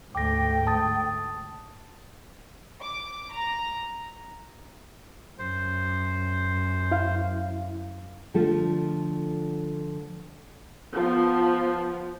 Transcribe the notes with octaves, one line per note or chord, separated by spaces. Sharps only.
D2 G#2 A3 G5 D6 A#6
A5 D#6 A6
D6
A#5
F#2 C5
E4 F5
D3 F3 A3 F4 A4
F3 B3